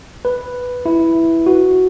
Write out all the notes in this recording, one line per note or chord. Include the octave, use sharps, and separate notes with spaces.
B4
E4
F#4